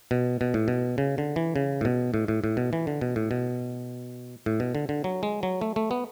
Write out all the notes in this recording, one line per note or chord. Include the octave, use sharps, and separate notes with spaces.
B2
B2
A2
B2
C#3
D3
E3
C#3
A2
B2
A2
A2
A2
B2
E3
D3
B2
A2
B2
A2
B2
D3
D3
F#3
G#3
F#3
A3
A3
B3